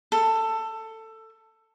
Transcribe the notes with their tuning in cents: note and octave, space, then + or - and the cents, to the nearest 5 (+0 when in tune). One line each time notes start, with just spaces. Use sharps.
A4 +15